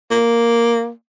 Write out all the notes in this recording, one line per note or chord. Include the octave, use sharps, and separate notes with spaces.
A#3